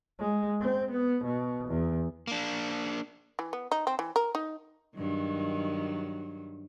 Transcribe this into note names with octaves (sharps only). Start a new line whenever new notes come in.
G#3
C4
B3
B2
E2
A#3 D4
E3
B3
D#4
C4
E3
A#4
D#4
G2 D#3 F#3